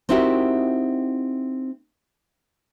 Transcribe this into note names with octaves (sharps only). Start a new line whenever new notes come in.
C4 D#4 E4 F#4 G4 A#4